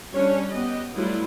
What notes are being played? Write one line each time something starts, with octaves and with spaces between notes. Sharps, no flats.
G3 C#4 D4 C#5
B3 G4 D#5
F#3 G3 A3 E4 F4 B4